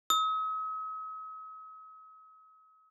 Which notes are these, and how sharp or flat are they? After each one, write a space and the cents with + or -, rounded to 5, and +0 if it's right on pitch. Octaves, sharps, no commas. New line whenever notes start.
D#6 +45